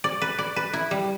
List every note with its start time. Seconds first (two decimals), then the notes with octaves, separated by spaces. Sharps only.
0.04 D5
0.22 B4
0.39 D5
0.56 B4
0.73 E4
0.91 G3